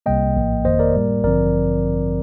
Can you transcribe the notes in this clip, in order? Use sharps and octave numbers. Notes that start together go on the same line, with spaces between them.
C2 C3 G3 A#3 D#5 G5
A#1 A2 F3 A#3
G1 F2 D#3 A#3 C5 D#5
A#4 D5
A2 G3 A#3
A1 G2 D3 F3 C4 A#4 D5